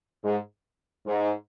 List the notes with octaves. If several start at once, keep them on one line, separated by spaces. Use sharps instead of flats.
G#2
G#2